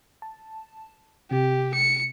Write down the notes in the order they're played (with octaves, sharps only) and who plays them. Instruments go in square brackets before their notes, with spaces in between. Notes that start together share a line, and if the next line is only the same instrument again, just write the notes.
[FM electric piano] A5
[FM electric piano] C3 [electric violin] G4
[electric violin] C#7